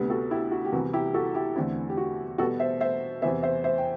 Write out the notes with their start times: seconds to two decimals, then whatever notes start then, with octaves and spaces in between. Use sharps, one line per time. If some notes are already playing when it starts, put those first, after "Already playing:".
Already playing: D2 C3 G3 B3
0.10 F#4 A4
0.31 E4 G4
0.52 F#4
0.65 G4
0.72 C2 C3 E3 B3 F#4
0.93 E4 G4
1.14 F#4 A4
1.34 E4 G4
1.55 E2 D3 A3 C4 E4
1.89 G4
1.97 F#4
2.38 B2 G3 B3 F#4 A4
2.60 C5 E5
2.81 C5 E5
3.22 E2 C3 E3 B3 C5 E5
3.43 C5 E5
3.64 C5 E5
3.78 G5